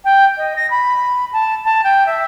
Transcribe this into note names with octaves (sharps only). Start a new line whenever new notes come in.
G5
D#5
A#6
B5
A5
A5
G5
E5